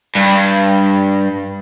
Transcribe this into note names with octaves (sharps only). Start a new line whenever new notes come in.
G2